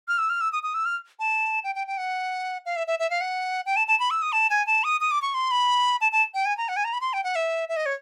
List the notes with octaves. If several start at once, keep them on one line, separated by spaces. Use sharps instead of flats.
F6
E6
F6
E6
D#6
D#6
E6
F6
A5
G5
G5
G5
F#5
F5
E5
E5
E5
F5
F#5
G5
A5
A5
B5
E6
D#6
A5
G#5
A5
D#6
D#6
D6
C#6
C6
B5
A5
A5
G5
G#5
A#5
F#5
G#5
A#5
B5
C6
G5
F#5
E5
E5
D#5
C#5